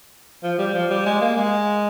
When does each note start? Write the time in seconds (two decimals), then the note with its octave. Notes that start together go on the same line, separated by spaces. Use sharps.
0.43 F3
0.58 G3
0.74 F3
0.90 G3
1.06 G#3
1.21 A#3
1.37 G#3